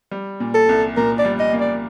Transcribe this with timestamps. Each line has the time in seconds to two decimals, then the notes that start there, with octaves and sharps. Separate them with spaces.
0.11 G3
0.40 A#2
0.54 A4
0.69 C2
0.97 A#2 A#4
1.19 D5
1.25 G3
1.39 D#5
1.53 A#3
1.60 D5